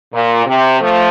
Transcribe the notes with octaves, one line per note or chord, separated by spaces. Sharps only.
A#2
C3
F3 A3